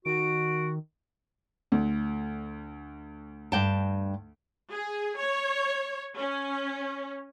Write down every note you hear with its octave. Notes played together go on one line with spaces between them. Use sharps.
D#3 F#4 D7
D2
G2 G5 A5
G#4
C#5
C#4